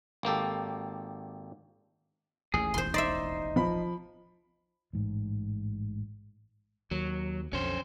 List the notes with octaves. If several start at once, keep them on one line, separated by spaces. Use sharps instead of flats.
G#1 A#3 G4 A4
A1 D#2 A2 G#4
E1 A1 D#2 C5 C6
D#4 C5 D5 E5
F3 B5
A1 G#2
D#2 F#3
B1 F2 D3 C#4 C5